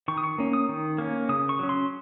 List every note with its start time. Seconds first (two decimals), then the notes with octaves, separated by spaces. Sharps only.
0.08 D#3 C#6
0.18 D#6
0.24 C#6
0.38 A#3 C#4
0.53 D#6
0.69 D#3
0.98 A#3 C#4
1.29 C#3 D#6
1.49 C#6
1.59 F#3 C#4
1.69 C6